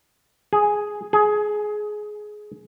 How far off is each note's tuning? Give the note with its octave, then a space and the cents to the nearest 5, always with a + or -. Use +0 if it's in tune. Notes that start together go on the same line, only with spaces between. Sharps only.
G#4 +0
G#4 +15